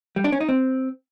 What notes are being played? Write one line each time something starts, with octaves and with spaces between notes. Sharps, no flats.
G3
D4
C#4
D#4
C4